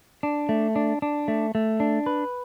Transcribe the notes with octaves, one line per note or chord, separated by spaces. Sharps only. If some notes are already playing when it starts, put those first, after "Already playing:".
D4
A3
D4
D4
A3
A3
D4
B4